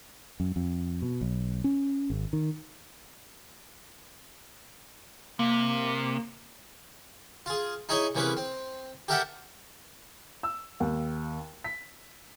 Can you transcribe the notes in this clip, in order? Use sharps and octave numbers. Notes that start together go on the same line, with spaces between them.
F#2
F2
B2
B1
C#4
G#1
D#3
C3 A#3
F4 G#4
D#4 E4 G#4 C#5 D#5
C3 E3 A#3 C#4 G#4 B4
C4
G4 A4 A#4 E5 F#5 G5
E6
D#2
B6